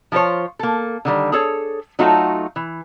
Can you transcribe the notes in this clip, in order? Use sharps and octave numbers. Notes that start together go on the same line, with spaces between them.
F3 F4 A4 C5 C#5
A#3 A4
D3 D#3 G3
G#4 A4 C#5
F#3 A3 D#4 F4 F#4 A4
E3